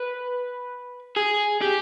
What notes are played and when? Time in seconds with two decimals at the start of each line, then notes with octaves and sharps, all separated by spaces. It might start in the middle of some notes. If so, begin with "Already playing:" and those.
Already playing: B4
1.16 G#4
1.61 G4